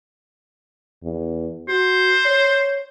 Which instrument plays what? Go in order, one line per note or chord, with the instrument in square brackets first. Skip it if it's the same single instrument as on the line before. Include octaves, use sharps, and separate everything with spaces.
[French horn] E2
[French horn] F#4 [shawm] C5
[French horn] C#5